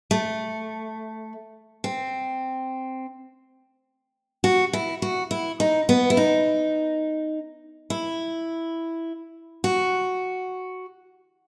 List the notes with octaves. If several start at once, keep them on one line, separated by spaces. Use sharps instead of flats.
A3
C4
F#4
E4
F#4
E4
D#4
B3
E4
D#4
E4
F#4